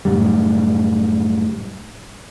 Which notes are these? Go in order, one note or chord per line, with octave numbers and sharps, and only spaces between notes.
F#2 A2 C#3 G3